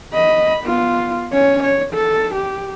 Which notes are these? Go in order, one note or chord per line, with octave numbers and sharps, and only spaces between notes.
D#5 B5
B3 F4
C#4 C#5
C#5
A4
G4